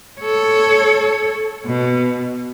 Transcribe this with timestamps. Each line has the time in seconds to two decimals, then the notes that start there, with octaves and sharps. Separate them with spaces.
0.20 A4 C#5
1.66 B2